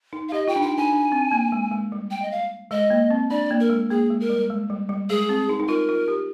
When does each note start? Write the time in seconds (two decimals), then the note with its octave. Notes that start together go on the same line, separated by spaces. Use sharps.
0.13 D#4
0.29 F5
0.32 G4 D#5
0.48 F4 G5
0.56 D4
0.62 D#4 G5
0.77 D4 G#5
0.93 D4
1.12 C4
1.32 A#3
1.52 G#3
1.71 G#3
1.92 G3
2.11 G5
2.22 D#5
2.31 F5
2.71 G#3 D#5
2.90 A#3
3.10 C4
3.31 D4 D5
3.51 A#3
3.60 A#4
3.70 G#3
3.90 A#3 G#4
4.10 G#3
4.20 A#4
4.30 G3
4.50 G#3
4.70 G3
4.89 G3
5.10 G#3 G#4
5.29 C4
5.49 D#4
5.60 D#4
5.68 F4 A#4
5.89 F4
6.08 G4